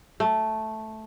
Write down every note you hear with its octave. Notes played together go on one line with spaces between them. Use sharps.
A3